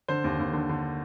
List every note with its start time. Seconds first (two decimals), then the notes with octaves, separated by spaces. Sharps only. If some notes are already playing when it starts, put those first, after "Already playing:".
0.08 D3 C5
0.24 D#2
0.39 D#2
0.53 D3
0.69 D3